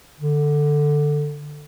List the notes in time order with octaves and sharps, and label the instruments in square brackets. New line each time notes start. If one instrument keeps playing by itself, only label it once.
[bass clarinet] D3